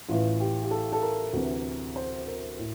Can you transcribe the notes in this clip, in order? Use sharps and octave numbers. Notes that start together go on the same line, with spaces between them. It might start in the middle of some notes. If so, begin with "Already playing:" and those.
A1 A2 E3 F4
G4
G4
A4
A4
A#4
D2 C3 E3
C5
A#4
A2